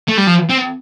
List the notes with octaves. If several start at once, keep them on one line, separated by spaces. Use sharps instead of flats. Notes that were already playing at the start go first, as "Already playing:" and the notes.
A3
G3
F3
C4